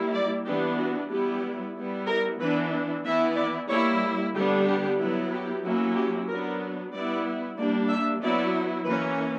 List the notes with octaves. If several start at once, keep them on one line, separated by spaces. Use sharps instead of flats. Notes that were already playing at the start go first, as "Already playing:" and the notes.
Already playing: G3 A#3 E4
D5
E3 B3 D4 G4
F#4
G3 B3 E4 G4
G3 B3 E4
A#4
E3 B3 D4 B4
E3 B3 E4 E5
D5
G3 A#3 E4 C#5
D3 G3 B3 D4 G4
G4
F#3 B3 E4
G4
F#3 A#3 C#4 E4
G4
F#3 B3 D4 A#4
G3 B3 E4 D5
G3 A#3 D4 D5
E5
F#3 B3 E4 D5
E3 A#3 C#4 B4